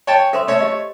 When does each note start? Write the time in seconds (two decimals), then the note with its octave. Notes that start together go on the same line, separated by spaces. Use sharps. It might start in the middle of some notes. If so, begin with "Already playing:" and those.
0.07 C#5 G5 A5
0.33 A4 C5 E5 C6
0.47 A3 C#5 E5
0.60 G4 D#5